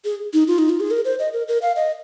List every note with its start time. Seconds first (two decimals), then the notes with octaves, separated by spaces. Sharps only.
0.05 G#4
0.34 D#4
0.48 F4
0.58 D#4
0.69 F4
0.80 G#4
0.91 A#4
1.05 C5
1.19 D#5
1.33 A#4
1.48 A#4
1.62 F5
1.76 D#5